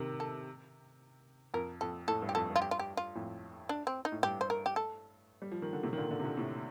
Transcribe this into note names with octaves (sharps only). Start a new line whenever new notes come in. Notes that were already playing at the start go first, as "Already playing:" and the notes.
Already playing: C3 D#3
A4
F2 A#4
F2 A4
A2 A4
G2
G4
F2 A4
G2
F4
G4
F4
G4
F4
F2 A2
D4
C4
D#4
A2
G2 G4
C5
A#4
G4
A4
G3
F3
D#3
D3
A2 C3
D#3
A#2 D3
A#2 D3
C3
A#2 D3
A2 C3